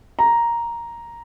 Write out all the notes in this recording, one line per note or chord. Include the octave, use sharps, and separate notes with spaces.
A#5